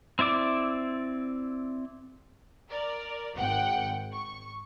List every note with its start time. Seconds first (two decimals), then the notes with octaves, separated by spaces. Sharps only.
0.19 C4 E4 D5 D6
2.70 A#4 D5
3.35 G#1 F#5 G5
4.13 C#6